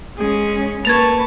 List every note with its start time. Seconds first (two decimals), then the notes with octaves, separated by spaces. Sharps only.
0.18 G#3 C#4 G#4
0.85 A#3 B4 A5 C#6 G#6 A6 F7